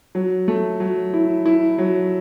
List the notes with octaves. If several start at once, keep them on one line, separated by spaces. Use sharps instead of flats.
F#3
A3
F#3
E4
E4
F#3